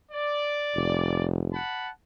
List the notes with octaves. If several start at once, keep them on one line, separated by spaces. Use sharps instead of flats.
D5
F1
F#5 A5 B5